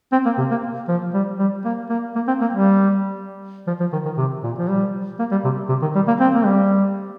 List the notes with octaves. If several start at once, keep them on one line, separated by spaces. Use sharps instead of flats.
C4
A#3
C3
A#3
F3
G3
G3
A#3
A#3
A#3
C4
A#3
G3
F3
F3
D#3
D#3
C3
A#2
F3
G3
A#3
G3
C3
C3
D#3
G3
A#3
C4
A#3
G3